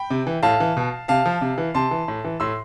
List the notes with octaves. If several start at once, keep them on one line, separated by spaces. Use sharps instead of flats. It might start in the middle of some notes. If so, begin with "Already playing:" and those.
Already playing: G5 B5
C3
E3
A2 F5 A5
E3
B2
C3 F5 A5
F3
C3
E3
C3 A5 C6
E3
A2
E3
A2 C6 E6